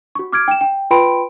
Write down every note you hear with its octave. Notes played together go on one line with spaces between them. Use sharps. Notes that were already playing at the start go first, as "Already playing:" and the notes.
F#4 C#6
D6 F6 G#6 D7
G5 E7
G5
F4 B4 G5 B5 C6 D7